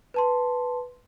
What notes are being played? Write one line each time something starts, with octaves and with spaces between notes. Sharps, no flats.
B4 A5 C6